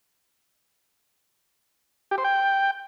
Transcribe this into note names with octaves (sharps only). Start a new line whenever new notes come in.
G4
C5
G5